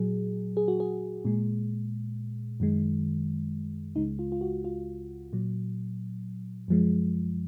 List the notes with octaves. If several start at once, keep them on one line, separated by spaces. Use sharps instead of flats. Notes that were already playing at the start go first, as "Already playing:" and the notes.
Already playing: A#2 F#3 G#4
G#4
F#4
G#4
A#2 G#3
F#2 D#3 G#3
C#2 C#3 G#3 D#4
F4
F4
F#4
F4
A#2 F#3
F#2 F3 G#3